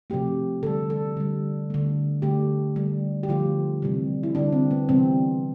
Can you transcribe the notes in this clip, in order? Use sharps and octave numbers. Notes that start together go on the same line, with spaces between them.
C3 F3 A3 G4
D3 G3 A4
A4
D3 G3
D3 A3
D3 A3 G4
D3 G3
G4
D3 F3 A3 F4
C3 E3 G3
E4
D3 G3 D4
C4
B3
C3 E3 G3 C4